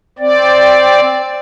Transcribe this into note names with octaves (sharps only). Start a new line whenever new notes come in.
C4 D5